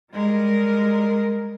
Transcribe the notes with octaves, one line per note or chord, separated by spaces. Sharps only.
G3 G#3 A#4